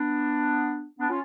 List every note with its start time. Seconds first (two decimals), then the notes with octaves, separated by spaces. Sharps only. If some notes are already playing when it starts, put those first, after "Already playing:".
Already playing: B3 D4
0.99 B3 D4
1.09 C#4 F4